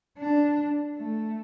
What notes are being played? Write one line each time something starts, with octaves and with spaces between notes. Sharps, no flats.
D4
A3